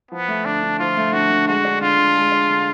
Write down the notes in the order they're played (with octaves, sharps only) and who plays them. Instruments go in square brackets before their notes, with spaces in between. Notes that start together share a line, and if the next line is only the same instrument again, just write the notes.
[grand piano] F3 [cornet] B3
[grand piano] A3
[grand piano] D3 [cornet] D4
[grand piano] D3
[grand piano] F3 [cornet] F4
[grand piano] A3
[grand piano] D3 [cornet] F#4
[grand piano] D3
[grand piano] G#3 [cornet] F#4
[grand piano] D4
[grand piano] D3 [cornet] F4
[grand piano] D3
G#3
D4
D3